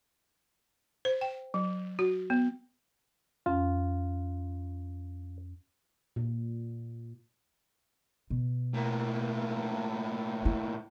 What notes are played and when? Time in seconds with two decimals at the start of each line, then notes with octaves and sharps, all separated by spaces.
1.05 C5
1.21 G5
1.54 F#3
1.99 F#4
2.30 B3
3.46 F2 C#4 F4
6.16 A#2
8.30 B2
8.74 A2 A#3
10.45 E4